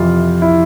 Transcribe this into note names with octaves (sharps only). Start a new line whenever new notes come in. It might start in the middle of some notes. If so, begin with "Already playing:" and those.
Already playing: F2 C3 E3 F4
E4